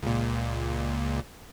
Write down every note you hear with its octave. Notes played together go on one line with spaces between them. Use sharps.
C#2 A#2